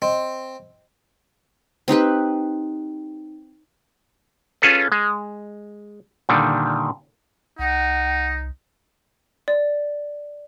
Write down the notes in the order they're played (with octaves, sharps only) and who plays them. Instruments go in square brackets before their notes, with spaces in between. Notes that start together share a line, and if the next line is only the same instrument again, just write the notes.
[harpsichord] C4 [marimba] D#5
[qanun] C4 D#4 G4 B4
[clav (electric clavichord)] C#4 F4 G#4 A4 B4
G#3
A#2 D3 D#3 G3
[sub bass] C2 [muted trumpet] D#4 [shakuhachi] F#5
[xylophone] D5